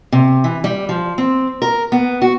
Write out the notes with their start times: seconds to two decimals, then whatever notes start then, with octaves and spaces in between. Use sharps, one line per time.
0.12 C3
0.44 E3
0.64 G3
0.89 F3
1.18 C4
1.62 A#4
1.92 B3
2.22 F#4